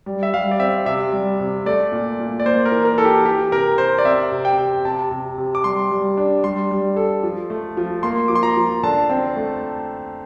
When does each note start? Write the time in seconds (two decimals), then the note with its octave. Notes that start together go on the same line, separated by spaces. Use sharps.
0.06 G3
0.23 E5
0.34 G3 F5
0.51 D5
0.59 C4 E5
0.86 C3 E5
1.12 G3
1.40 C3
1.66 A3 D5
1.92 A#2
2.20 A#2
2.40 D5
2.45 A#3 C5
2.65 A#4
2.72 E3
2.85 A#4
2.98 E3 A4
3.05 G4
3.25 E3 G4
3.52 C3 A#4
3.78 C3 C5
3.98 D5
4.05 C4 E5
4.32 C3
4.45 G5
4.58 C3
4.85 C3 A5
5.11 C3
5.38 C3
5.55 D6
5.64 G3 C6
5.91 G3
6.17 D4
6.44 G3 C6
6.71 G3
6.96 A4
7.23 F3
7.50 A3
7.77 F3
8.03 A#3 C6
8.28 F3 D6
8.36 C6
8.43 A#5
8.57 F3
8.83 D3 A5
9.10 C4
9.36 A3